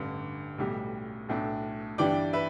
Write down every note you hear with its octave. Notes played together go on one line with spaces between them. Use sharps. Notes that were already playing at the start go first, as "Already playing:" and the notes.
Already playing: A1 G2 D3
B1 A2 G3
B1 A2 A3 D4
G2 E3 G3 B3 D4 D5 G5
B4 E5